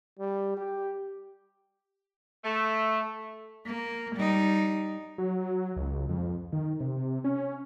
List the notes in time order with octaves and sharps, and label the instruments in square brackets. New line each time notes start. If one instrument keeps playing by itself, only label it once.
[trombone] G3
G4
[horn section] A3
[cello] A#3
G3 D#4
[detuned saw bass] F#3
C#2
F2
D#3
C3
C#4